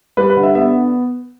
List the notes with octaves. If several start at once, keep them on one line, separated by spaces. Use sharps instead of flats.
G3 B4
B4
D3
E5
B3 E5